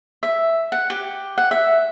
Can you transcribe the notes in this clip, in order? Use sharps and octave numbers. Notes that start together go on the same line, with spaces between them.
E5
F#5
G4
F#5
E5